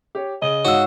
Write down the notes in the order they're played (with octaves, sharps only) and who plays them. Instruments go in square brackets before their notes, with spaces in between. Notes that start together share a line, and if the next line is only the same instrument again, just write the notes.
[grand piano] G4 C#5
[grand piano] C#3 [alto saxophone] D#5
[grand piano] G#2 F5 [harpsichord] F#4 [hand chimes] C#5 F#5 E6